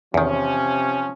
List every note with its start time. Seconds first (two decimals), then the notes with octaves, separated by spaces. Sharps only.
0.14 E2 C3 D#3 F3 C#4